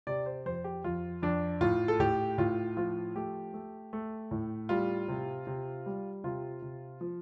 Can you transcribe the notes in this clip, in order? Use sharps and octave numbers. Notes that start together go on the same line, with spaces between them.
C3 D5
C5
F2 C5
G4
F2 F4
F2 D4
A2 F4
A4
A2 G4
A2 F4
F3 F4
A3 G4
A3
A3
A2
G3 F4
C3
C3
G3
C3 F4
C3
F3